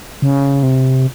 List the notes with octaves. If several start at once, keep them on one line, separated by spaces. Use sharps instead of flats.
C#3
C3